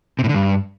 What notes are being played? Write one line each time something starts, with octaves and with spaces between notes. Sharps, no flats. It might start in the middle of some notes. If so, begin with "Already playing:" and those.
C3
A2
D3
G2